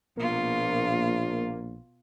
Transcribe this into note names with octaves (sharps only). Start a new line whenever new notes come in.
A#1 B2 A#3 F4